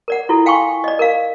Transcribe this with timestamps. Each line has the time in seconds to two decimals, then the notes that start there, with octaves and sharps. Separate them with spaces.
0.08 A#4 D5 F#5
0.29 E4 F4 A4
0.46 F5 G5 G#5 C6 C#6
0.84 D5 D#5
0.99 A#4 F5